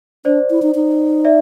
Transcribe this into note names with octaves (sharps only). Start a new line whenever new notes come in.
D4 C5 D5
E4
D#4
D#4
D5 E5